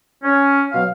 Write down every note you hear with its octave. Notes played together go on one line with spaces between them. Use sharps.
C#4
B2 F#3 F5